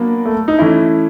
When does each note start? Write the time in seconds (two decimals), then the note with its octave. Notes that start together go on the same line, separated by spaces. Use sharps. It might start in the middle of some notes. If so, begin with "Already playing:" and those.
Already playing: F#3 A#3 B3 D4
0.26 A3
0.48 D#4
0.58 E3 A3 C#4 E4